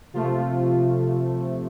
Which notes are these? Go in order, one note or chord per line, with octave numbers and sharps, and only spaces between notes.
C3 F3 A3 F4